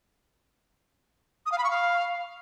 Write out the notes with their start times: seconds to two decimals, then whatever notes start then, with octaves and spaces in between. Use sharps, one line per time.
1.46 D#6
1.52 F5
1.58 B5
1.64 C#6
1.70 F5